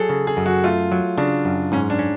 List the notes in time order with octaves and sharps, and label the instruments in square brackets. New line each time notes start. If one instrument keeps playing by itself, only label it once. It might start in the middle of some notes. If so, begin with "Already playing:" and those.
Already playing: [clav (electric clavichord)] F#3 [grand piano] G#4 A4
[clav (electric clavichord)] C#3
[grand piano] G#4
[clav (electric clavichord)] F#2
[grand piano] F#4
[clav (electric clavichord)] A3 [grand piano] F4
[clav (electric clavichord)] F#3
[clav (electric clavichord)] C#3 [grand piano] D4
[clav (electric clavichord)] F#2
[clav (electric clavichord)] G#2 [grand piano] C#4
[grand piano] D4
[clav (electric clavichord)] C#4